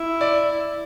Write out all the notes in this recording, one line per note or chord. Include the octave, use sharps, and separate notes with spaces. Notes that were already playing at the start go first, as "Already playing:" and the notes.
Already playing: E4
D5